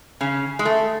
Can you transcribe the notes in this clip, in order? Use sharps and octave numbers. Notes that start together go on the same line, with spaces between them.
C#3 C#4
G#3
A3